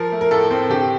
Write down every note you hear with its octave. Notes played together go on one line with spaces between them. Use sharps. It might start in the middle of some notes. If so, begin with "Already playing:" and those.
Already playing: F3 A#4
A3
A#4
A2 A4
C4
D3 G4